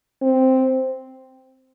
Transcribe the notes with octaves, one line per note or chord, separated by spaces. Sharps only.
C4